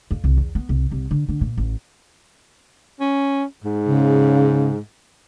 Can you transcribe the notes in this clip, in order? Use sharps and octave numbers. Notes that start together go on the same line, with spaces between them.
F2
C2
E2
B3
C2
C2
D3
D3
A#2
A1
C#4
G#2
C#3